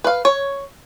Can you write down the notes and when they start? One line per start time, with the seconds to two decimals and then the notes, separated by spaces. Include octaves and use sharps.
0.04 B4 F5
0.25 C#5